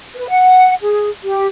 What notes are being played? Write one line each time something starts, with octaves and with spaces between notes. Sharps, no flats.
B4
F#5
G#4
G4